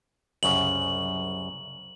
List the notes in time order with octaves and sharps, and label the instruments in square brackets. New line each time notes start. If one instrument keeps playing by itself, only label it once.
[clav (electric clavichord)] C2 F#2 C#3 [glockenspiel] F#7